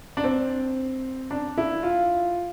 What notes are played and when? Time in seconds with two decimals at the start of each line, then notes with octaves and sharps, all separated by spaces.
0.17 D4
0.24 C4
1.31 D4
1.58 E4
1.83 F4